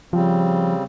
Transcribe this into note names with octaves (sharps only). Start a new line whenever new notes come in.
C#3 F3 G3 C4